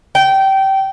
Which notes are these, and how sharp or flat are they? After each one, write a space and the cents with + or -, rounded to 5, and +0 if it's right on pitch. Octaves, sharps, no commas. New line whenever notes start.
G5 -20